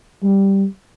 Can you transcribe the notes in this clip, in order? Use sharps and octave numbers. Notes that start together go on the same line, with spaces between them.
G3